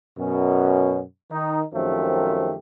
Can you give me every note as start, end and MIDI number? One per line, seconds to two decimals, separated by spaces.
0.18 1.01 42
0.18 1.01 47
0.18 1.01 61
1.31 1.62 51
1.31 1.62 63
1.74 2.54 42
1.74 2.54 51
1.74 2.54 53
1.74 2.54 57
1.74 2.54 60
1.74 2.54 67